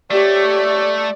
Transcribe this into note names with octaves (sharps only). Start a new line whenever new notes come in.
A3 G4 C#5 D5